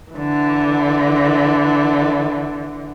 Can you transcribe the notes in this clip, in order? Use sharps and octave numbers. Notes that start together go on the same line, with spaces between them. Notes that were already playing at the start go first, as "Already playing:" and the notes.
D3 E3